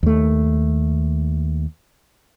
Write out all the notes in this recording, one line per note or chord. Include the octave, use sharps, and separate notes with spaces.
D#2 A3